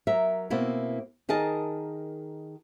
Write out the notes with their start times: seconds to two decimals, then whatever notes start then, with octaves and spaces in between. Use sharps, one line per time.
0.07 F#3 A#4 E5
0.50 B2 A#3 C4 E4
1.29 D#3 G#4 A#4 D#5 A5